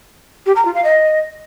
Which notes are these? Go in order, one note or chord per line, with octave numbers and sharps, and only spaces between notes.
G4
A#5
F4
F5
D#5